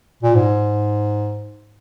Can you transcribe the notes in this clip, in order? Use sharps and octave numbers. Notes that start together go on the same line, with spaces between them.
A#2
G#2